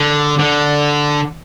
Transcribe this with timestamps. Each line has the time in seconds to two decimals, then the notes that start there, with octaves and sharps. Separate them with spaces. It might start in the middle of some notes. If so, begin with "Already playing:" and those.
Already playing: D3
0.39 D3